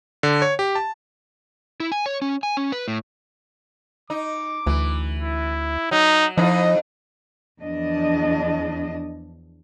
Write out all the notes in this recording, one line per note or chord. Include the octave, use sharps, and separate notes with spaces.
D3
C#5
G4
A5
E4
G#5
C#5
C#4
G#5
C#4
B4
A2
D#4 D6
D2 E3
E4
F#3 D#4
F2 F3 D#4 E4 D#5
E2 F3 D4 D#5